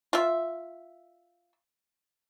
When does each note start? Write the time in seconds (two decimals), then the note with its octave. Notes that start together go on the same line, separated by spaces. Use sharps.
0.13 F4 E5